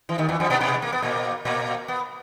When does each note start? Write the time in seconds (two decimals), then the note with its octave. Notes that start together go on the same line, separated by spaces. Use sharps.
0.09 E3
0.18 D#2 D#3
0.29 E2 E3
0.40 F2 F3
0.50 B2 B3
0.61 B2 B3
0.82 A#3
0.92 B3
1.02 A#2 A#3
1.45 A#2 A#3
1.88 B3